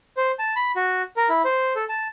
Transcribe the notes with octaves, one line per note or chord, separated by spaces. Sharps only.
C5
A5
B5
F#4
A#4
E4
C5
A4
A5